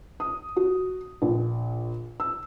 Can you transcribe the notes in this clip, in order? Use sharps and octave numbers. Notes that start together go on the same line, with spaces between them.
D#6
F#4
A#1
E6